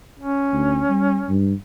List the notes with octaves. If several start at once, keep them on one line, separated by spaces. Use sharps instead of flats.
C#4
D2
G3
G2